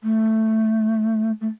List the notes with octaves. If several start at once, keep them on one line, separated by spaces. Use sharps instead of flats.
A3
A3